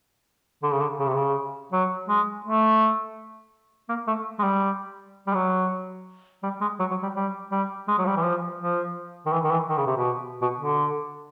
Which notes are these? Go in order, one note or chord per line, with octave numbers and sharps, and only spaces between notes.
D3
C#3
D3
C#3
C3
C#3
F#3
G#3
A3
A#3
A3
G#3
G3
G3
F#3
G3
G#3
F#3
F#3
G3
G3
G3
G#3
F#3
G3
E3
F3
F3
D#3
E3
D#3
E3
D#3
C#3
C3
B2
B2
D3